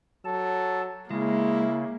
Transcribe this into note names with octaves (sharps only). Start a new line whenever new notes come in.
F#3 A4 A5
C#3 G#3 A#3 E4